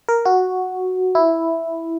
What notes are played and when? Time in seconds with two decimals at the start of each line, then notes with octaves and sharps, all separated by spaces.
0.09 A#4
0.25 F#4
1.15 E4